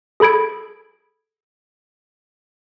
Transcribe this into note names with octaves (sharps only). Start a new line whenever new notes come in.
G#4 A4 B5 G#6 D7